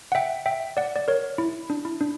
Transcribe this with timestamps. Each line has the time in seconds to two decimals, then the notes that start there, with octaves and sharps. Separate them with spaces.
0.12 F#5
0.15 E5 G5
0.46 E5 G5
0.77 D5 F#5
0.96 D5
1.08 A#4 C#5
1.38 E4
1.70 D4
1.85 E4
2.01 D4